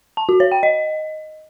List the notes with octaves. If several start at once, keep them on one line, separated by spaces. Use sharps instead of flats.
A5
F#4
C#5
G5
D#5